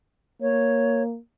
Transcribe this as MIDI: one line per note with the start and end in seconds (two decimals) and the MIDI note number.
0.42 1.18 58
0.42 1.03 73